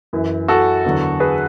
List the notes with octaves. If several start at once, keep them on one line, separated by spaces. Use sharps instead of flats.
F#2 E3
F#4 A4
E2 D3 F#3
G#4 B4